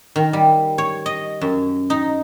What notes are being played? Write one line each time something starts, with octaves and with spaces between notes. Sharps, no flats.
D#3
G3
C#5
D#5
F#2
D#4